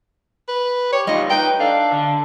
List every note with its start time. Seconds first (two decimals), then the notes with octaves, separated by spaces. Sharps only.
0.49 B4
0.93 G4 C#5
1.08 G3 D#4 F4 D#5
1.30 D#4 B4 G5
1.60 D4 A4 F5
1.91 D3